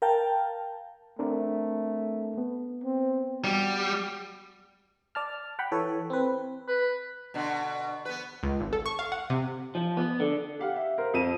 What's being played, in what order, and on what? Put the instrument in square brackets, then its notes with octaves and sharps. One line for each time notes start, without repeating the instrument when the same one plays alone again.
[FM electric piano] A#4 F5 G5 A5
[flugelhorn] A3 [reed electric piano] C4 D4 A#4
[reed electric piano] B3
[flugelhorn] C4
[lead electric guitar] G3 [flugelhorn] F#4
[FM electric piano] D5 A5 F6
F#5 G5 B5
E3 A4 C#5
C4 B4
[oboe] B4
[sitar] B2 D3
B3 B4
[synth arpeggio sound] C#2
G#1
A4
C#6
F5
F#5
C3
[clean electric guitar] F3
B3
D3
[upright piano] G4 F5 F#5
E5
A#4 C5
F2 F4 D#7 E7